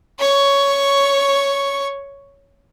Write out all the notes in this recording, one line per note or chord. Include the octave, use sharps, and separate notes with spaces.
C#5 C#6